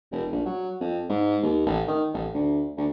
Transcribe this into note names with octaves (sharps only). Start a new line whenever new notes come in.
F1
A#1
F#3
F2
G#2
D#2
A1
D#3
A1
D2
D2